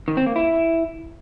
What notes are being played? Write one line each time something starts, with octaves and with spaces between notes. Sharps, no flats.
D#3
C4
A#3
E4